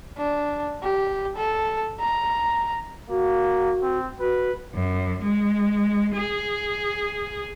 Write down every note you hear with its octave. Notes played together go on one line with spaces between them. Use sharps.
D4
G4
A4
A#5
A#3 F#4
C4
F#4 B4
F#2
G#3
G#4